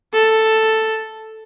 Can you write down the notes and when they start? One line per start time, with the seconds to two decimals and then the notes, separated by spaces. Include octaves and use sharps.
0.13 A4